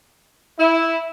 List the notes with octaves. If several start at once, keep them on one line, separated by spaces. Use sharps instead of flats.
E4